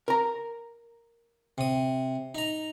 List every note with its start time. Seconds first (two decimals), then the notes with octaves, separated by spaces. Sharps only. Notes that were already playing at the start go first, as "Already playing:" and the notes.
0.08 A#4 A#5
1.58 C3 D#6
2.35 D#4 A#5